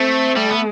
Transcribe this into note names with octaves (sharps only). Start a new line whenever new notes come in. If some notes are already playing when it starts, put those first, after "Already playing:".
Already playing: A3 C4
G3 A3
B3